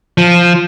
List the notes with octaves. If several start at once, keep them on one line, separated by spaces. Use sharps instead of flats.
F3